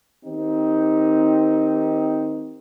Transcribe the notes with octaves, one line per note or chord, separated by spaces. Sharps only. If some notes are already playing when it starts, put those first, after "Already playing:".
D#3 C4 D#4 G4